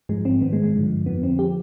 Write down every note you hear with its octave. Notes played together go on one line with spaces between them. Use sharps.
G#2 F3 G#3
C4
G#2 D#3 B3
G#3
G#3
G2 D3 F3
F2 D3 F3 B3
C4
F3 G4